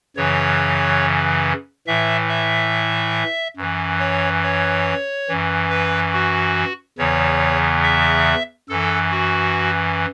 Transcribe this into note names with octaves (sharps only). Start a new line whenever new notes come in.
F#2 C#3 E3 C#5
A2 E3 E5
E5
F#2 E3
C#5
C#5
F#2 E3
B4
F#4
E2 C#3 E3 C#5
E5
F#2 E3 A4
F#4